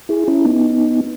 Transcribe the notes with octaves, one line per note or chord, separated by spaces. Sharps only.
E4 G#4
C#4 E4
B3 D#4